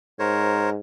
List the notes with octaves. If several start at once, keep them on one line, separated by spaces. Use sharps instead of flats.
G#2 A#4 C5 C#5